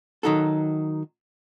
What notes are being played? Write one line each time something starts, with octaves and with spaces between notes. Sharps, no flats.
D#3 F#3 D#4 F#4 A4